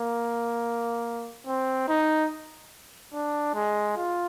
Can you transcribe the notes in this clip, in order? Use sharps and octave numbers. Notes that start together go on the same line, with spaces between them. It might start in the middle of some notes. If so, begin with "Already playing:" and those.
Already playing: A#3
C4
D#4
D4
G#3
F4